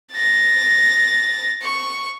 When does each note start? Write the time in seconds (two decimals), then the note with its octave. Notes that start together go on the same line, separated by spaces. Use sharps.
0.12 A6 A#6
1.62 C#6